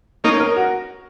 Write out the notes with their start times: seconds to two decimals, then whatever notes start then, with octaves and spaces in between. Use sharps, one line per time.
0.24 A#3 C#4 D#4
0.40 A#4
0.56 F#4